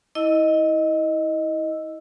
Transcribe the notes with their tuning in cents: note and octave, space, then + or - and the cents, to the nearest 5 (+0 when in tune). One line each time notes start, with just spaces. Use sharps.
E4 -30 D#5 +0 E6 +0